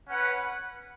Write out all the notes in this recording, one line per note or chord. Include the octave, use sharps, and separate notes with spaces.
C#4 B4 F#5